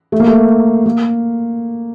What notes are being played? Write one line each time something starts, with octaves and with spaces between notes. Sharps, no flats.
A3
A#3
A3
A#3